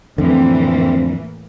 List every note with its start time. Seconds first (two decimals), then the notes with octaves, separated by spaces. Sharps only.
0.18 F2 A2 D3 E3 A#3 C4